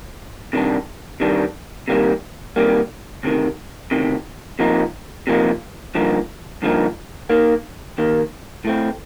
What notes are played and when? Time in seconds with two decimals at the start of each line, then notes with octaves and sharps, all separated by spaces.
0.53 C3 D#3 G3 D4
1.20 C3 D#3 G3 D4
1.88 C3 D#3 G3 A#3
2.56 C3 D#3 G3 A#3
3.23 D2 C3 D#3
3.91 D2 C3 D#3
4.59 C3 F3 A#3 D#4
5.27 C3 F3 A#3 D#4
5.95 G2 D3 F3 A#3 D#4
6.62 G2 D3 F3 A#3 D#4
7.30 D#2 D#3 A#3
7.98 D#2 D#3 A#3
8.65 A2 A3 C4